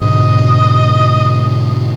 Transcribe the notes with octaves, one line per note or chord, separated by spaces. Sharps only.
G#2 B2 D3 D#5